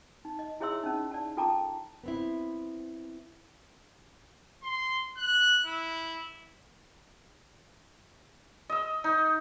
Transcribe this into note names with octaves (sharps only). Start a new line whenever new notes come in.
D#4
D#5
E4 G#4 C#5 E5 C6 E6
C#4 D#4
D5 A5
F4 A4 G5 A5 A#5 D6
B3 C4 E4
C6
F#6
E4
D#5 E6
D#4